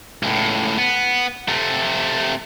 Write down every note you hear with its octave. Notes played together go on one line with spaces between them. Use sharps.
C#2 A2
B3
C3 A3